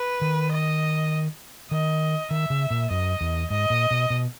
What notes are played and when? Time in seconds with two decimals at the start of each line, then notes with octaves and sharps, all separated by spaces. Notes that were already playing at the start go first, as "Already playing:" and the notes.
Already playing: B4
0.21 D#3
0.51 D#5
1.71 D#3 D#5
2.31 D#3 E5
2.50 C#3
2.70 A#2
2.90 F#2 D#5
3.21 E2
3.50 G#2 D#5
3.70 A#2
3.91 B2
4.10 B2